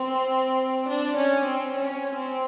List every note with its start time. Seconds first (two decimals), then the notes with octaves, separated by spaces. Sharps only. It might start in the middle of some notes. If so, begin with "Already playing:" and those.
Already playing: C4
0.89 D4
1.17 C#4
1.45 C4
1.73 C#4
2.15 C4